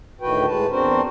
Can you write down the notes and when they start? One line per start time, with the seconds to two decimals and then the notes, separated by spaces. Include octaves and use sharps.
0.21 D2 A2 D#3 F#4 B4 G5
0.47 A2 G#3 B4 A5
0.70 E2 C4 D4 F#4 A#4 C5